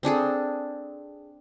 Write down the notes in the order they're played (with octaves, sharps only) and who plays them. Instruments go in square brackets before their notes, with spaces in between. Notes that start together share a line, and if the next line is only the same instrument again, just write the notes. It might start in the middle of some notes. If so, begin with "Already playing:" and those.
[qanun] C4 D4 G#4 A4